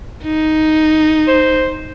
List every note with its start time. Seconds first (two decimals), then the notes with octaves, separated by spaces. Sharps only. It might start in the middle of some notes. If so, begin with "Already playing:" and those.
0.24 D#4
1.28 C5